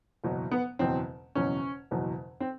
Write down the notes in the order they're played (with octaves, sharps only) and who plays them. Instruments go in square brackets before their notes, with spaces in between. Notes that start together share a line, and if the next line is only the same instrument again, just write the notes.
[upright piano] F#1 E2 B2 F#3
B3
F#1 E2 B2 F#3 C4
F#1 E2 B2 F#3 C#4
F#1 E2 B2 F#3
C4